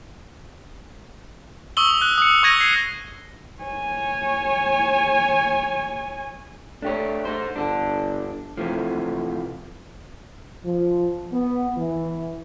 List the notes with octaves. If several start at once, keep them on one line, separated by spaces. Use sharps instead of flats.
C#6 D#6 E6 F#7 G7
F#6
D#6 C#7
C#6 E6 G#6 A#6 D#7
C7
C#5 G#5
A3 D4 G4 C#5
D#4 C5
G1 D4 A4
C3 E3 F3 A3
F3
B3
E3